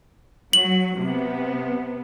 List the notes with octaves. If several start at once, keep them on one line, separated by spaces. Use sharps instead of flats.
F#3 F#7
C3 B3